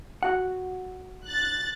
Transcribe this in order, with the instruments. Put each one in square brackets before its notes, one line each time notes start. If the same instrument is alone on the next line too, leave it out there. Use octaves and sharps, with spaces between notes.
[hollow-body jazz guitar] F#4 F#5
[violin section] F#6 A6